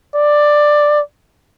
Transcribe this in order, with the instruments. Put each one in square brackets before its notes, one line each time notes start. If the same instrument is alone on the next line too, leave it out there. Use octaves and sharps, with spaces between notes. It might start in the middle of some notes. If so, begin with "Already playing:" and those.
[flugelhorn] D5